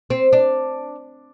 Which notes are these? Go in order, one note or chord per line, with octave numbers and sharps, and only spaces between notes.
C4
D4